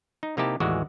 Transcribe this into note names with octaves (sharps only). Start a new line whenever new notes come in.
D#4
C3 A#3 D#4 E4 G4 A5
A1 D#2 E3 G#3 F#4 D5